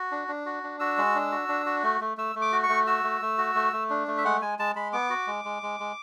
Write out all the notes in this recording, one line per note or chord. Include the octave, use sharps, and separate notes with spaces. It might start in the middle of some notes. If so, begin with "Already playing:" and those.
Already playing: F#4
D4
D4
F#4
D4
F#4 E6
G#3
D4
F#4
D4
F#4
A3
A3
A3 E6
A3
D6
F#4
C#6
A3
F#4 E6
A3
A3
F#4
A3
A3
D4
A3
E5
G#3 F#5
G#3 G#5
G#3 A5
G#3 B5
B3 D6
F#4
G#3
G#3
G#3
G#3